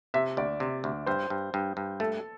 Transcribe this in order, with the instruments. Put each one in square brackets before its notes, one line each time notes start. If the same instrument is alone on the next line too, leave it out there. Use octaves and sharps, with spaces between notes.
[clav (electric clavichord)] C3 [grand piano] E5
[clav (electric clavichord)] D2 [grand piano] D5
[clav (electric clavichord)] C3
D2
[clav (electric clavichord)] G2 [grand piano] C5
[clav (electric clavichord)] G2
G2
G2
[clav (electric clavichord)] A3 [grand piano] A4